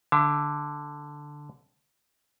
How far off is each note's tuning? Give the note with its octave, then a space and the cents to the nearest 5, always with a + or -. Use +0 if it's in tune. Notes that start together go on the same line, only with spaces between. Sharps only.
D3 +0 E5 +40